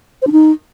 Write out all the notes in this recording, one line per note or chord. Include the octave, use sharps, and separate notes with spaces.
C5
D4
D#4